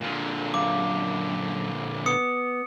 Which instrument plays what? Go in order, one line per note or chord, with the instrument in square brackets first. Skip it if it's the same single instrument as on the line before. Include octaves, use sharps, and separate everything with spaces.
[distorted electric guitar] A#2 D3
[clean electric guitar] F#2 F5 [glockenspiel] D6
[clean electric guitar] B3 [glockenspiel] D#6 C#7